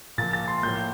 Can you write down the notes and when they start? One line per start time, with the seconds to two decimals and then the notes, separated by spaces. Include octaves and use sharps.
0.18 A#2 F3 A#3 A6
0.33 A6
0.48 C6
0.63 A2 F3 A#3 G6